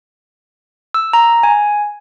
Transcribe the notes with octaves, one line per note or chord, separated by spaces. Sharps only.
E6
A#5
G#5